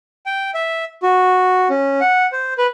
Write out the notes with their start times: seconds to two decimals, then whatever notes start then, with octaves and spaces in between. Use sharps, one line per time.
0.26 G5
0.54 E5
1.03 F#4
1.70 C#4
2.01 F#5
2.32 C5
2.58 B4